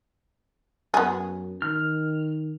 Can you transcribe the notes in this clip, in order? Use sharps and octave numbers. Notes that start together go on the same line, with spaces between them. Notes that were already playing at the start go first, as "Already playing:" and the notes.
F#2 B3 G#4
D#3 F6